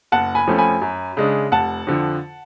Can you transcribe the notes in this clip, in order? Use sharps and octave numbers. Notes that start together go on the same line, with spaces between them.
F#1 F#5 A5
G#5 B5
F2 F3 A3 C#4
G#5 B5
F#2
C#3 G#3 D4
F1 F#5 A5
F2 D3 F3